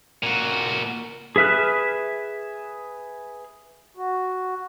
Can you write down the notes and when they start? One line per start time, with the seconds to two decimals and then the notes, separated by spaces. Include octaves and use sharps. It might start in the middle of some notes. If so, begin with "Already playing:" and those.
0.23 A#2 F#4
1.36 G#4 B4 E5 F6 F#6
3.97 F#4